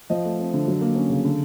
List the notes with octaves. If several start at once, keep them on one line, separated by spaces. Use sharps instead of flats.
F3 D#5
A3
C4
D3
F#3
A#3
C#4
C#3
D3